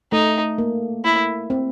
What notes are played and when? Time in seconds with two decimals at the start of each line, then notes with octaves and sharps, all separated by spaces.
0.12 A3 D#4
0.58 A#3
1.04 E4
1.50 C4